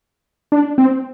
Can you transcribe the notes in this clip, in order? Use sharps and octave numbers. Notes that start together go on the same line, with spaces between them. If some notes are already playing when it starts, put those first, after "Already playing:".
D4
C4